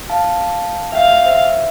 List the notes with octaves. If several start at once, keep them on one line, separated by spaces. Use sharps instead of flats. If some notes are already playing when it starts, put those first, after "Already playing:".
F5 A5
E5 F5 G5
C5 E5